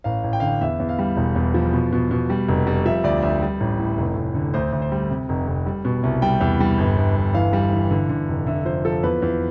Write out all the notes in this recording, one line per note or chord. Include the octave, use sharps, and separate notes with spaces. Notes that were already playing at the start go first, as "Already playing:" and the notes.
A1 F5
A1
G5
D3 F5
G5
E2 E5
E2
F5
G3
E1
E2
F3
B2
B2
B2
G3
F1
G3
F3 E5
D2 D5
D2 E5
G3
A1
A2
F1
F1
D3
D2 C5
D2
C5
G3
C3
F1
F1
G3
B2
C2
G3 G5
E2
G3
G1
G1
G1
E3 F5
G3
E3
D3
D3
F1
D3 E5
F3 C5
F3 A4
E2 B4
E2